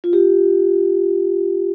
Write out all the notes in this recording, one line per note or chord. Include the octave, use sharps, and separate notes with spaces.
F4
G4